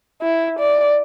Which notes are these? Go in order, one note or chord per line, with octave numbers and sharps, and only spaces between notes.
E4
D5